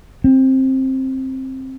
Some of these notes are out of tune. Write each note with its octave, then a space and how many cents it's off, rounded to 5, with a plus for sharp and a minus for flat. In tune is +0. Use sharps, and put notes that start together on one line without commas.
C4 +15